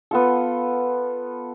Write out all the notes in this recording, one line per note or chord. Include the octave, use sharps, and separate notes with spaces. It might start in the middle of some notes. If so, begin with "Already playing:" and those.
B3 F4 A4